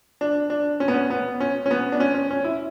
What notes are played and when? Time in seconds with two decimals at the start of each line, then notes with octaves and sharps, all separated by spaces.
0.21 D4
0.50 D4
0.80 C#4
0.88 B3
0.94 C#4
1.10 B3
1.40 C#4
1.66 C#4
1.71 B3
1.92 D4
2.00 C#4
2.14 C#4
2.31 C#4
2.44 E4